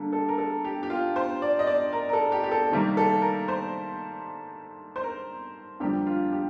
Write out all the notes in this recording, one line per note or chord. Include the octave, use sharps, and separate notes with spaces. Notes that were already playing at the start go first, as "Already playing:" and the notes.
Already playing: D3 G3 A#3 A4
A4
A#4
A4
G4
G4
F4
C5
D5
D#5
D5
A#4
A#4
A4
G4
G4
A4
C3 D#3 G3 A#3
A4
A#4
C5
C5
A#4
F2 D3 G3 A#3 G4
F4
G4